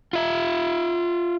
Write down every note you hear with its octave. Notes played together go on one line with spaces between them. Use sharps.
F4 E5